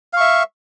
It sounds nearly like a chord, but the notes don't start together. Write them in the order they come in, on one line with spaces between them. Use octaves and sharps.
F5 C#6 E5